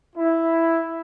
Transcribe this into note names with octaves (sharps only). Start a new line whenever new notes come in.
E4